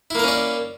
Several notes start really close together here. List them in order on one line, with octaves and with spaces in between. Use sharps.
E4 A#3 A#4 C#4 D5